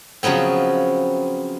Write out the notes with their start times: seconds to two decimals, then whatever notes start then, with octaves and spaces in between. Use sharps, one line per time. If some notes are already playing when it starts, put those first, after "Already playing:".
0.23 C#3 F3 F#3 B3 C4